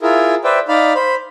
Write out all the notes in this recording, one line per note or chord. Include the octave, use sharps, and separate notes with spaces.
E4 F4 G#4 A#4
B4 C5 D5 E5 G5
D#4 D5 F5 B5
C5 B5